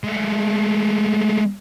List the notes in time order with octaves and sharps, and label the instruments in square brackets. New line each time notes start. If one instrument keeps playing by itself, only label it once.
[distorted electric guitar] G#3 A3